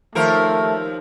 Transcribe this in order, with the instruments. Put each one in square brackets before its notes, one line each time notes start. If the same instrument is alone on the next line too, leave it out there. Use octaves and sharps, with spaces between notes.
[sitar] D#2 F3 A#4 [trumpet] A3